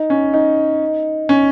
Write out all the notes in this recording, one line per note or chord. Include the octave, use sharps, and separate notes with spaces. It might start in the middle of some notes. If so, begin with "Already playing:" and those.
Already playing: D#4
C#4
D#4
C#4